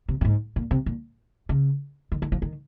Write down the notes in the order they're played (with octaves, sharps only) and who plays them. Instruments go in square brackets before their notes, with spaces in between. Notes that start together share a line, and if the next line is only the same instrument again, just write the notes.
[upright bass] C3
A#2
G#2
A#2
C3
A#2
C#3
D#3
D#3
F3
D#3